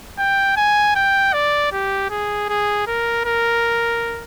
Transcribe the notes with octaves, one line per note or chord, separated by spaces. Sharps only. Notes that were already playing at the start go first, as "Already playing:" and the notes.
G5
G#5
G5
D5
G4
G#4
G#4
A#4
A#4